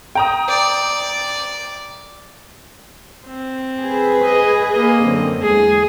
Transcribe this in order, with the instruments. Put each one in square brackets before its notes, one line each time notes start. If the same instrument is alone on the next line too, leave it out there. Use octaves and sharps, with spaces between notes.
[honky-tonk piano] G5 A#5 D#6
[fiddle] D5
[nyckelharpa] C4
[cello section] G#4 B4
[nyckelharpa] D#5
A#3 D#5
[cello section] F#2 D3 C4
[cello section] E2 G#3 [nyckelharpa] G#4